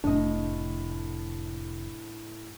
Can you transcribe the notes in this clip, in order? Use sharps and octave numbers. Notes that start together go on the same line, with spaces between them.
F1 A2 D4 D#5